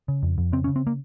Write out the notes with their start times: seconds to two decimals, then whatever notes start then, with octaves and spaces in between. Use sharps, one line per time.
0.08 C#3
0.23 F2
0.38 F2
0.52 C#3 C4
0.64 C#4
0.68 C#3
0.76 C4
0.87 A#3